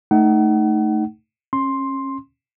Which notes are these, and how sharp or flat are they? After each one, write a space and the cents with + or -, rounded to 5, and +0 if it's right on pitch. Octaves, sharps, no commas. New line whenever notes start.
A3 +0 D#4 +0 F#5 +35
C#4 -30 C6 +10